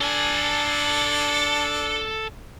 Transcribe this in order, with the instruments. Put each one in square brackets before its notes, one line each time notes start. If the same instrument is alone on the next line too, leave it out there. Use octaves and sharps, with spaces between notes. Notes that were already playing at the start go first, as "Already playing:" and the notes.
[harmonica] D4 [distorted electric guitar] A4 G#5